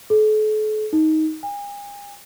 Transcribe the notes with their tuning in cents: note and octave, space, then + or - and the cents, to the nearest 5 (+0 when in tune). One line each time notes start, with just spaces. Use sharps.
A4 -40
D#4 +15
G#5 -40